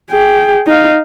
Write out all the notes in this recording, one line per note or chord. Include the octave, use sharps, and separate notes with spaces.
G#4 G5
D#4 F5